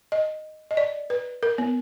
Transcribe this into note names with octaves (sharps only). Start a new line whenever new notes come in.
D#5
D#5
D5
B4
A#4
B3